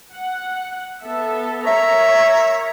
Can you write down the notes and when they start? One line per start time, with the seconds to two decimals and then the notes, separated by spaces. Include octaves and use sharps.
0.14 F#5
1.02 B3 A4 E5
1.67 A#4 C#5 E5 A#5